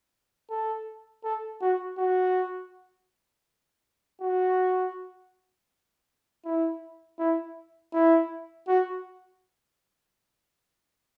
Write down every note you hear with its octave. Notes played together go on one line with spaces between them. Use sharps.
A4
A4
F#4
F#4
F#4
E4
E4
E4
F#4